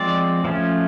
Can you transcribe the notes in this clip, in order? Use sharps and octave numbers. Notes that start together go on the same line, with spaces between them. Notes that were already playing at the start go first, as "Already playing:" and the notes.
Already playing: F3 G#3 C4 D5
F3 A3 C#4